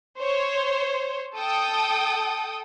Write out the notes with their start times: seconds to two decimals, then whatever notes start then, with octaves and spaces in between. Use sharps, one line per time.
0.20 C5 C#5
1.36 A4 G5 D#6